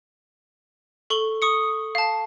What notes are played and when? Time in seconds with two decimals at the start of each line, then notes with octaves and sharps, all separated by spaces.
1.10 A4 C#6 F#7 G7
1.42 C#6 D#6 C#7
1.95 F5 A5